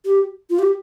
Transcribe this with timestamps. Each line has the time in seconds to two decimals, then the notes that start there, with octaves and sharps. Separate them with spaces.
0.05 G4
0.50 F4
0.59 G4